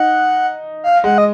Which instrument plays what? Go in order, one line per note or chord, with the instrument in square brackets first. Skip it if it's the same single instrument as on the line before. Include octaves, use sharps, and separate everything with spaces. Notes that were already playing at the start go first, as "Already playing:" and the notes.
Already playing: [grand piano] D#4 [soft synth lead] F#5
[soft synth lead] F5
[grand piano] G#3 [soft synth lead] F#5
[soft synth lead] D#5